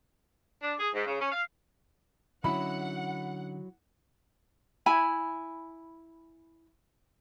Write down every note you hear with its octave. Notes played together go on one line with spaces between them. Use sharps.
D4
G#4
G#2
C#3
C#4
F5
D3 F#3 C#4 D#4 E4 F#5 B5
E4 G#5 B5